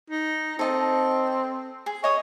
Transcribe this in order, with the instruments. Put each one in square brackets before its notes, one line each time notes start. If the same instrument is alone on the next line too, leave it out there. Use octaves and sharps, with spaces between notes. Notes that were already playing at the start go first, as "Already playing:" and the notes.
[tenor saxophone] D#4
[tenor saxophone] C4 [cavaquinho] A4 D#5 A5
[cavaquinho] G#4
[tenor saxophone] C#5 [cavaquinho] D#5 D#6